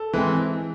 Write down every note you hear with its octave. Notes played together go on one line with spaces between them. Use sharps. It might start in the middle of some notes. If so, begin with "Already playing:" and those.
Already playing: A4
E3 G#3 C4